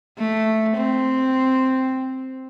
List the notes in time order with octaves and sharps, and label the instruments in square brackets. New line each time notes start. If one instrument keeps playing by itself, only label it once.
[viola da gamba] A3
C4